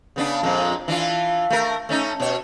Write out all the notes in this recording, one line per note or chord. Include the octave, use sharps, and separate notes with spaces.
C#3 B3 D4
F2 A#2 G#3
E3 D4 F4
A3 A#4
A3 C#4 D#4
B2 C#5